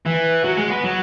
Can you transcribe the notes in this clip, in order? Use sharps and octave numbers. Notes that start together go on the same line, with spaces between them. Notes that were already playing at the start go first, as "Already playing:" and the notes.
E3
F#3
G#3
B3
F#3